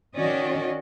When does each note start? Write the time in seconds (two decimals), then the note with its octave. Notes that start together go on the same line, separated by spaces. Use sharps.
0.16 D#3 C#4 F#4 D5 D#5